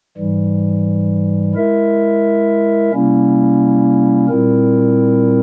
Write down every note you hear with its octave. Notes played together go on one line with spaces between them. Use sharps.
G#2 E3 G3
G#3 E4 A#4 E5
C3 G3 A#3 C#4 E4
A#2 G3 C4 E4 A#4